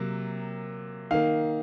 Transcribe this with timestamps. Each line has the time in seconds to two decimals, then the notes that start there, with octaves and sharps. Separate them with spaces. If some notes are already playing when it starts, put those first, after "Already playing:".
Already playing: C3 F#3 A#3
1.11 D#3 A#3 F5